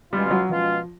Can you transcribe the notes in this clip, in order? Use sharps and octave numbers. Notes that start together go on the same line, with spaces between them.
B2 G3 G#3 C#4 F4
G3
F#3
B2 F3 G#3 C#4 F4